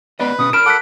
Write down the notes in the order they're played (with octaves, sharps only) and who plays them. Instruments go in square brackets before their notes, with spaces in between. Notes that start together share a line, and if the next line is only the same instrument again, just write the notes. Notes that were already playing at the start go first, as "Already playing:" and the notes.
[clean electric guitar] B3 D5 D#5 [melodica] B4
[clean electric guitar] B2 C#4 [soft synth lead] D#6
[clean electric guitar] A#4 A5 B5 [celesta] F6 E7 [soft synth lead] D7
[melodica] A4 F#5 [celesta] D6 F#6 B6